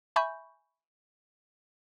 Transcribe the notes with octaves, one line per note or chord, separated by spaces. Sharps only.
E5 G#5 B5 C#6 G6